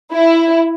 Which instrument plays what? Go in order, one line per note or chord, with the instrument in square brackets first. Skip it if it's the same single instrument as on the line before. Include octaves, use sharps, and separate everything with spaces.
[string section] E4